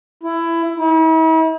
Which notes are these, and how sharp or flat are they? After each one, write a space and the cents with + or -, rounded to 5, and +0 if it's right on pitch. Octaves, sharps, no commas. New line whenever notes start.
E4 +15
E4 -45